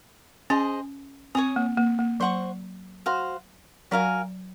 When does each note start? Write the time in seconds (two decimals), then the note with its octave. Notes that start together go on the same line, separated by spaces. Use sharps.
0.50 C#4 G#4 C5 D#5
1.35 C4 C#5 G#5 D#6
1.56 A#3
1.77 A#3
1.99 A#3
2.20 F#3 C5 F#5 C#6
3.06 F#4 C5 F5
3.91 F#3 F#4 A#4 F5 G#5